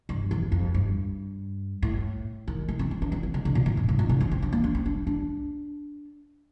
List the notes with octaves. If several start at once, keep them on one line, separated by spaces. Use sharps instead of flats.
G2
F2
F2
G2
A2
D#3
A3
C4
C4
D4
C4
C4
D3
D3
A#2
A2
G2
A2
A#2
D3
C4
C4
D4
A#3
D4
C4
D4
D4